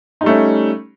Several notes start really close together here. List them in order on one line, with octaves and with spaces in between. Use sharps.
D#4 G3 A3 C#4